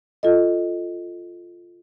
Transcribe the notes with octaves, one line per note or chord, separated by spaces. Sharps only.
F4 A4 D#5